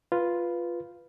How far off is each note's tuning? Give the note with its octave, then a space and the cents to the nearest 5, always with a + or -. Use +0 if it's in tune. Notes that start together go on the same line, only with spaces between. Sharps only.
F4 +0 B4 +0